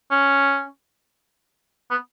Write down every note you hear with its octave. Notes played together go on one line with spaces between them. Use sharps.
C#4
B3